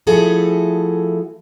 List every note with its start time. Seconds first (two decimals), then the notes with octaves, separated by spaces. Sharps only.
0.07 F3 A3 E4 F#4 G#4 A4